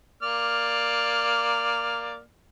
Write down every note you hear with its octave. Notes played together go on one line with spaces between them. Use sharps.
A#3 D5 F6